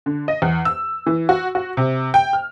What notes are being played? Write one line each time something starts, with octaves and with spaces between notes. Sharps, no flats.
D3
D#5
E2
E6
E3
F#4
F#4
C3
G5
F6